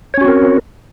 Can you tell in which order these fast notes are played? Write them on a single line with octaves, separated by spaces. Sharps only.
C#5 C#4 F#4 C4 A#4